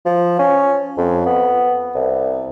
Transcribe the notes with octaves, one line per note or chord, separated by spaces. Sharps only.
F3
C#4
F2
B3
C2